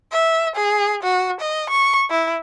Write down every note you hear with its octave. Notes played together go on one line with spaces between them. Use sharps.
E5
G#4
F#4
D#5
C#6
E4